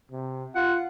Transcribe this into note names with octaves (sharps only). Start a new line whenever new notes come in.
C3
F4 F#5